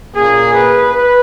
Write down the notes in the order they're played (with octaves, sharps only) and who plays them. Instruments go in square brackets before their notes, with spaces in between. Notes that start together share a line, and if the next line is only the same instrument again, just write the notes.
[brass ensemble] A#2 A#3 C#4 G#4
B4
B4